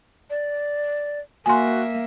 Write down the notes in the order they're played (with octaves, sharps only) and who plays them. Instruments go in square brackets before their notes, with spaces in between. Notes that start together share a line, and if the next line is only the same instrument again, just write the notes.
[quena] D5
[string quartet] A#3 E5 [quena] F#4 [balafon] G#5 C6